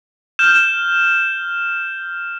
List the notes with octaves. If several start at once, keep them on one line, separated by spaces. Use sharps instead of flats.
F6 G6 E7